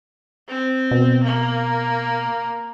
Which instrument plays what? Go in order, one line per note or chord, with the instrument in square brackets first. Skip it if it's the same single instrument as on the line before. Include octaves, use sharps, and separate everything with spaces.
[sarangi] C4
[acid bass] B2
[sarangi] A#3